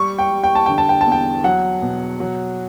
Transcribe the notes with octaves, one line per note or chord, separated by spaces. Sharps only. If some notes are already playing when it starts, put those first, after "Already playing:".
Already playing: G3 C#6
G5
G3
G5
A5
D3 G5
A5
G5
A5
E2
G5
F#3 F#5
B2
F#3